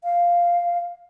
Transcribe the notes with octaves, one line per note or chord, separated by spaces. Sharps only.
F5